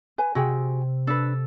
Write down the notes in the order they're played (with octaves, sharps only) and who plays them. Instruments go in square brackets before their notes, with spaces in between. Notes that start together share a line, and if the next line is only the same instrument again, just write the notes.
[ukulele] B4 G#5
[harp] C3 [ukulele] F#4 G#4 G5
[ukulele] D4 B4 [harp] A4